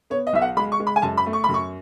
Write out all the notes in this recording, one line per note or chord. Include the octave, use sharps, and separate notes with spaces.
B3 C#5
D#5
B1 E5
F#5
G#3 B5
C#6
G#3
B5
G#5
F#2 A5
B5
A3
C#6
F#2 B5
C#6